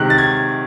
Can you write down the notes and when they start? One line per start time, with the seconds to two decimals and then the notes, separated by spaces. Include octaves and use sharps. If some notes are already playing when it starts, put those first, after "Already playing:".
Already playing: C3 D#3 G#3 F#6
0.10 A6
0.18 G#6